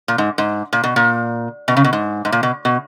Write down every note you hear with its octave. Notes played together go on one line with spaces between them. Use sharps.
A#2
G#2
G#2
A#2
B2
A#2
B2
C#3
B2
G#2
G#2
A#2
B2
B2